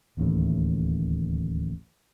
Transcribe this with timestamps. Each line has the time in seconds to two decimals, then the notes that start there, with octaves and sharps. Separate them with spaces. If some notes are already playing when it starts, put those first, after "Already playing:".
0.17 D1 A1 D#2 A2